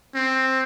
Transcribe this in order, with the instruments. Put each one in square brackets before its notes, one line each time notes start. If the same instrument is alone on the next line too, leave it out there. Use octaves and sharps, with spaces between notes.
[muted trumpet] C4